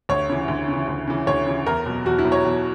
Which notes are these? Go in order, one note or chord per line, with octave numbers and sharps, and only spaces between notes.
D2 C#5
C#3 E3
D2
C#3 E3
D2
C#3 E3
D2 C#5
C#3 E3
E2 A#4
B2 F#3
E2 F#4
E4
B2 F#3
C#5
E2